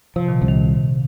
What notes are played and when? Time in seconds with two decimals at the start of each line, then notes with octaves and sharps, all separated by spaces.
0.16 C3 F3
0.28 A#2 D#3
0.41 C2 C3
0.48 D#3